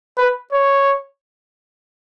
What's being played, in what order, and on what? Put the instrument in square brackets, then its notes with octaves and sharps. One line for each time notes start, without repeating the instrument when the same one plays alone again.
[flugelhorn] B4
C#5